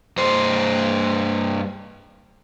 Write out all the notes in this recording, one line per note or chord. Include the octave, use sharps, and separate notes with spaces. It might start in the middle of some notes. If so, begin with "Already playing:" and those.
G2 C5